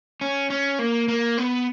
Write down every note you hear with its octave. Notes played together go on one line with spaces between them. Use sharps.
C#4
C#4
A#3
A#3
B3